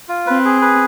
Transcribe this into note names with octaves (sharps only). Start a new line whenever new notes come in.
F4
C4 B4
G#4
B4